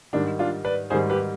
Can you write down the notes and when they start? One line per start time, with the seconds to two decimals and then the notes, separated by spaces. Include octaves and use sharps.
0.13 G#2 D#3 G3 D4
0.39 D4 F4
0.64 B4 D5
0.90 G#2 D#3 G3 G#4 C5
1.10 G4 B4